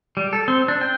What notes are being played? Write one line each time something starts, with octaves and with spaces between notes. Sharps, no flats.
G3
A4
C4
D4
G5